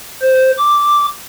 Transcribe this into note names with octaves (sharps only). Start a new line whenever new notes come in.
C5
D6